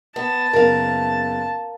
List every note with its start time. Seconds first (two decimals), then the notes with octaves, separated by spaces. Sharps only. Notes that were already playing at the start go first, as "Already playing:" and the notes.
0.16 B3 A5
0.53 F#1 B3 A#4 F5